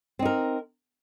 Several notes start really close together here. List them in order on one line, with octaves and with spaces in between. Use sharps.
C4 D#4 A#4